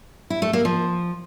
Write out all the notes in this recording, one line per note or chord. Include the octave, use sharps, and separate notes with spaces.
E4
A3
A#3
F3